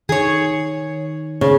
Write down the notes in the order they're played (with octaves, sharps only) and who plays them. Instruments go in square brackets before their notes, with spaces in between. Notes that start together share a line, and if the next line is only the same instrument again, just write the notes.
[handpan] D#3 [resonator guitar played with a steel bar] G#4 C#5
[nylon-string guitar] C#3 [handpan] C5